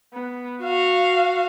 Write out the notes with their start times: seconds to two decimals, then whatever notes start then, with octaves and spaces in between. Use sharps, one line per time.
0.14 B3
0.63 F#4 F5